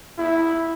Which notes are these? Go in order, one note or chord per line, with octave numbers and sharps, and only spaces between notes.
E4